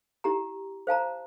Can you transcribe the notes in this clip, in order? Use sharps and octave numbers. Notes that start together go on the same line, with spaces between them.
E4 G4 A#5
C5 F5 A5 A#5